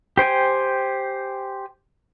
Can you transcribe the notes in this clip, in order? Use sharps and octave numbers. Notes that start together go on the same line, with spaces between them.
G4 C5 G5 G#5